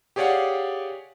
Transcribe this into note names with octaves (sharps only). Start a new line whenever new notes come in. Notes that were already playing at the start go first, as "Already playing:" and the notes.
G4 G#4 C#5 D5 F5 F#5